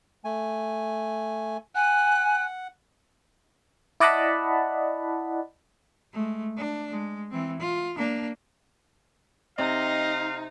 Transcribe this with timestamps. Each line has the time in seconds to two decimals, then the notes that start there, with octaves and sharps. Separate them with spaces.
0.25 A3 G#5
1.75 F#5 G#5 F#6
4.00 E4 D5 D#5 F#5 A5 B5
6.13 G#3 A3
6.57 D4
6.91 G#3
7.31 E3 C4
7.60 F4
7.97 A#3 D4
9.58 C3 D#4 D#5 F5